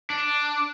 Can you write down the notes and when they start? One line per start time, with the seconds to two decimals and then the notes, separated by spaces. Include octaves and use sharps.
0.10 D4